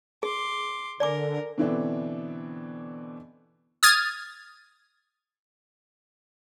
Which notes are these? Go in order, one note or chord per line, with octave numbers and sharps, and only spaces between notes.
G#4 C6 D6
D3 A#4 D5 G#5 D6
B2 D3 E3 B3 C4 D4
D#6 F6 G#6 A6